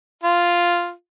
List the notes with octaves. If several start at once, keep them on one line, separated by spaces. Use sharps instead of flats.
F4